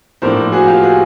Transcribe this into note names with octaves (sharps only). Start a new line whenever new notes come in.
A2 F3 A#3 D4 A#4 C5
F#4 G#4
F4 G4
F#4 G#4